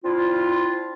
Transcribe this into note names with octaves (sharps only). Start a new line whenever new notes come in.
C4 D4 E4 F4